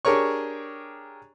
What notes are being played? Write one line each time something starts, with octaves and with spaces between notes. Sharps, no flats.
D4 G4 G#4 A#4 C#5 C#6